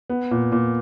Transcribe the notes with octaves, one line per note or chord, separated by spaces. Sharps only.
B3
A#2
A#2